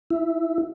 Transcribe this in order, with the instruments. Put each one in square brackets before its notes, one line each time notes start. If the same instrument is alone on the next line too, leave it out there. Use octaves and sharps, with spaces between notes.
[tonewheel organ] E4